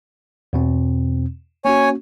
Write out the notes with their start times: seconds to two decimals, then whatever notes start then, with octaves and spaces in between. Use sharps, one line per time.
0.53 E2 B2 C4
1.65 A#3 C#4 F#4 C#5 G#5